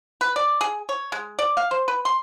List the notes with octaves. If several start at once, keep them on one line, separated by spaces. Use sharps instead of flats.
B4
D5
G#4
C#5
G#3
D5
F5
C5
B4
C6